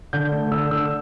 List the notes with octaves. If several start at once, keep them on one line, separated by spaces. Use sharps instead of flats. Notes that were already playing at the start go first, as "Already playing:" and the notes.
D3 G6
A3
D3 E6
D3 E6